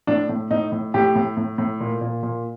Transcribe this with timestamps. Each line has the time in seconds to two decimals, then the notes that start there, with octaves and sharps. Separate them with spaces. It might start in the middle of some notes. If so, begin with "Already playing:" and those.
0.07 A2 D4
0.29 A2
0.51 A2 D#4
0.72 A2
0.94 A2 G4
1.15 A2
1.37 A2
1.58 A2
1.80 A#2
2.01 A#2
2.23 A#2